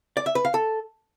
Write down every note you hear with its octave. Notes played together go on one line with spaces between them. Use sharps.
D5
E5
B4
F5
A4